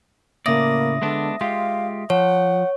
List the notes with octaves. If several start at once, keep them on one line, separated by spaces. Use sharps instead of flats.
A2 C#3 A#3 D5 E5 D#6 A#6
D3 G#3 B3 D4
G#3 F4 G4 F5
F3 C#5 F#5